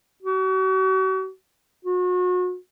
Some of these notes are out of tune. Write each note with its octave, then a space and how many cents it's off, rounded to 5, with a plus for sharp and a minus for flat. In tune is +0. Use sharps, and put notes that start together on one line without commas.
F#4 +40
F#4 -35